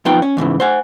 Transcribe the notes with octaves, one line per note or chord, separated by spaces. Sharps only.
F2 B3 D#4 F4 G5 A#5
C#4
E2 G#2 C#3 E3
C5 F#5 G#5